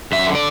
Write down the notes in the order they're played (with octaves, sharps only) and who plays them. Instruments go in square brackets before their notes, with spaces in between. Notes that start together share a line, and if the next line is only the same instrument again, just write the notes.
[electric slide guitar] F#2 E5
D3
D5